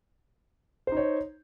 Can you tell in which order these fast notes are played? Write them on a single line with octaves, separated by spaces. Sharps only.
C5 D#4 C#5